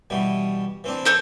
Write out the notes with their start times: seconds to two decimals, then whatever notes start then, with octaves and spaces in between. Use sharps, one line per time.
0.10 B2 E3 G3
0.84 E3 C4 D4
1.05 A4 C5 C#5